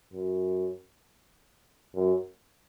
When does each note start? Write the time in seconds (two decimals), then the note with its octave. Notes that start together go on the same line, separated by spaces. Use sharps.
0.13 F#2
1.95 F#2